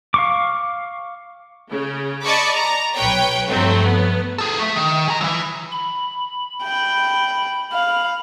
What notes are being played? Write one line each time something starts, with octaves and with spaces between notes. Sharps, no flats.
F5 C#6 D6
C#3
D5 D#5 A5 B5 C#6 D6
A#5
B1 B4 C#5 G5
G2 F3 F#3 A3 C4
B3
G#4 A4
A3 E5
D#3
G#4 A#5
E3 F#3
B5
G5
F5